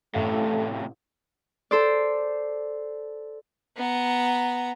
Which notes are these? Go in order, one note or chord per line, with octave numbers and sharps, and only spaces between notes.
A1 A2 C3 A3 A4 F5
A4 C5 D5
B3 A#5